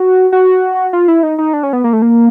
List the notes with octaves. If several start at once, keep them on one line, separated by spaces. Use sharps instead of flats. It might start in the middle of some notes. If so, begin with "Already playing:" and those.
Already playing: F#4
F#4
F4
E4
D#4
D#4
D4
C#4
B3
A#3
A3
A#3